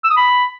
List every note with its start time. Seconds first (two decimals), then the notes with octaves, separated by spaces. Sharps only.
0.04 E6
0.10 D#6
0.16 B5